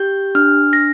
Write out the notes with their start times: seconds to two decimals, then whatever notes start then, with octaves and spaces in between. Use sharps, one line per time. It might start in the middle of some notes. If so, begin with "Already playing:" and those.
Already playing: G4 G6
0.35 D4 F6
0.73 A#6